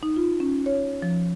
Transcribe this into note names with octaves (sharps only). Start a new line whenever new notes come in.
D#4
F4
C#4
C#5
F3